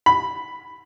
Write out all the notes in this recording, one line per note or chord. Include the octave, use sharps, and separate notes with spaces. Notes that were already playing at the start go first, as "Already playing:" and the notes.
B5